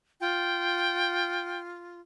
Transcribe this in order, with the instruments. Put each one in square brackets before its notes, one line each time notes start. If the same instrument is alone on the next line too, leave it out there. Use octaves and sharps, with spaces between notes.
[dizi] F4 [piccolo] G5